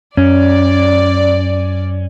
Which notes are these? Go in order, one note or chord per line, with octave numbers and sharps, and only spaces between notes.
F#2 C#4 D5